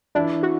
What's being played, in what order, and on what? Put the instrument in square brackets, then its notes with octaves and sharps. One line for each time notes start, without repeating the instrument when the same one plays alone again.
[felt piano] E3 E4 [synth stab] D4
[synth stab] F#4